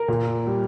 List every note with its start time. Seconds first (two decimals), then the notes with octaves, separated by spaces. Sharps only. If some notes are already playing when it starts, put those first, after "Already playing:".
Already playing: A#4
0.08 A#2
0.47 G3